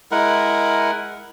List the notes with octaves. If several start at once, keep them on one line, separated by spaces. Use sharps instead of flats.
G#3 E4 A#4 F#5